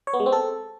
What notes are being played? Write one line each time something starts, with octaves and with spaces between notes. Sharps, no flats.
C#5
B3
G#3
C4
A4